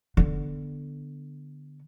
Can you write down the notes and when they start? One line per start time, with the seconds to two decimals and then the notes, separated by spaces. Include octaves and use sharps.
0.17 D3 B3